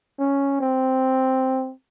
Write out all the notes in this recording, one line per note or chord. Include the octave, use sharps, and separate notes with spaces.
C#4
C4